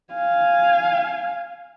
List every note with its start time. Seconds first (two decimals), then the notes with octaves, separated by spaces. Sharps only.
0.14 F5 G#5